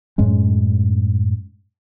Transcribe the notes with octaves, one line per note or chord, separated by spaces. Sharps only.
F#2 A2 G#3 C#4